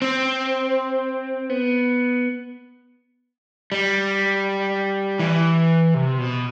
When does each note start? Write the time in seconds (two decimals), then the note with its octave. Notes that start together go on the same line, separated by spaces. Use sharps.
0.02 C4
1.50 B3
3.72 G3
5.19 E3
5.94 C3
6.19 B2